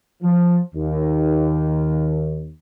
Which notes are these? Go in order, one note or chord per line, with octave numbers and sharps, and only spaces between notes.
F3
D#2